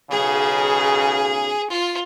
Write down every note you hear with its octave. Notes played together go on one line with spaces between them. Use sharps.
B1 C#3 G#4
F4